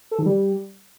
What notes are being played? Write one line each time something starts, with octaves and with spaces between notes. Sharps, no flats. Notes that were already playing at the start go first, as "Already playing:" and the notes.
A4
D#3
G3